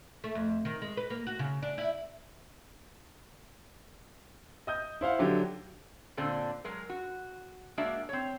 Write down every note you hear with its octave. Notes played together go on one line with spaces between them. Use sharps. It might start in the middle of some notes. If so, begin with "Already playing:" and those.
A3
F2
D#3
G#3
B4
A#3
F#4
C#3
D4
E4
D#5 D#6 G6
E4 C5 F5 F#5
D3 F#3 G4
A#2 D3 C4 D4
F#3 G#3 A#4
F#4
G#3 A#3 D4 F#4 D5 E5
C4 C#5